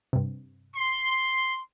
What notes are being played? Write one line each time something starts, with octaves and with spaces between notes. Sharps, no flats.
G2 C3
C6